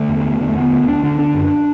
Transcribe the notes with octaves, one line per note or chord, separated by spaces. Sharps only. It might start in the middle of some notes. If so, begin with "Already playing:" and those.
Already playing: D3 A3
E2
E2
D3
A3
D3 B3
D2
D2 D4
D3 D4
D3 D4
F#2